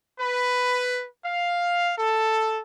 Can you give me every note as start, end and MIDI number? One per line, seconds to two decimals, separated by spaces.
0.20 1.06 71
1.25 1.93 77
1.98 2.60 69